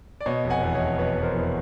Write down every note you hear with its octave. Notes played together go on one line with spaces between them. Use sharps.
D5
B2 C#5 D#5
F1
F#5 G#5
E2
C#5 D#5
F1
B2 B4 C#5
F1
A#4 C5
E2